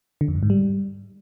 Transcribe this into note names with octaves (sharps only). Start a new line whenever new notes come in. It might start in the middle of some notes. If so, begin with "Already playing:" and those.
D3
F2
G2
G#2
G3